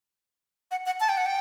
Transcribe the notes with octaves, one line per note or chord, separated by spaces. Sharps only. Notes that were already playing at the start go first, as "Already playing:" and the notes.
F#5
F#5
A5
G5
F#5
G5